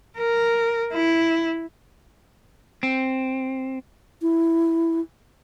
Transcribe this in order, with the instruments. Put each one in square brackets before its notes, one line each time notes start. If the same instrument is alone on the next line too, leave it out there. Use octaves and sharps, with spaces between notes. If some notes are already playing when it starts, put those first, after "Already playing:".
[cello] A#4
E4
[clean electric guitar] C4
[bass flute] E4